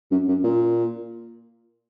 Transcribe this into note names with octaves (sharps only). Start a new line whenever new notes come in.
F#2
F#2
A#2